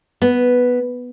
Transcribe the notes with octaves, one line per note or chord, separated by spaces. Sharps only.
B3